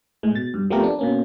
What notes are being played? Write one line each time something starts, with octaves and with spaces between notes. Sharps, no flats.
A2 G#3
B2 A6
G2
F3 A3 B3 C4 G4 A#4
D4
B2 A#3 C#4